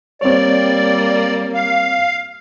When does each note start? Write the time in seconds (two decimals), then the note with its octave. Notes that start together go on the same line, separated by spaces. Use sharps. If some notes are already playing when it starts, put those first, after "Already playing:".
0.21 G3 A#3 C4 C#5 D5
1.54 F5